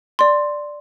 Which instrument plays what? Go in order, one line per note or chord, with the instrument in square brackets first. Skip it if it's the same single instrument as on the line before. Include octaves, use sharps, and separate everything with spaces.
[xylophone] D5 C6